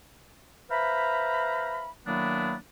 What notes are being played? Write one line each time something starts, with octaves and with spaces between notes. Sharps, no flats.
B4 C5 E5 F5 A#5 B5
D#3 F#3 A#3 B3 D4 E4